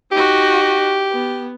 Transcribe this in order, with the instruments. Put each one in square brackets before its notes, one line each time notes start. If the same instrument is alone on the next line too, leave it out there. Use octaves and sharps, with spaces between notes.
[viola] D#4 F#4 [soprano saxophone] G4
[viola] B3